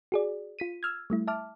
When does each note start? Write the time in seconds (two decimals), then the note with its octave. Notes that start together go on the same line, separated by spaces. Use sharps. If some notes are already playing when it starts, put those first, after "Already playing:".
0.12 F#4 G#4 D5
0.59 F4 B6 D#7
0.83 E6 F6 G#6
1.10 G3 A3 E4
1.28 E5 A5 D6 F6